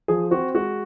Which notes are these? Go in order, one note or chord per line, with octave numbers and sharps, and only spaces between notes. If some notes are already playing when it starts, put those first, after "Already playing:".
F3 G#4
C4 F#4
G#3 F#4